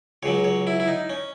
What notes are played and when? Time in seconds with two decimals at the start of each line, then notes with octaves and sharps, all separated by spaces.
0.23 C#2 C#3 F#3 C#5
0.44 C#5
0.67 E4
0.80 E4
0.88 D#4
1.10 C#4